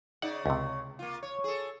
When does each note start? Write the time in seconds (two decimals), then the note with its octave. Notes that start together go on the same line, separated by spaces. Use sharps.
0.22 C#3 D#4 D5 F#5
0.46 C#2 C3
0.99 A#3 F4
1.23 C#5
1.44 G#4 A4